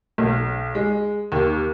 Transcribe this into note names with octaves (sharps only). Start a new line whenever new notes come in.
B1
G#3
D#2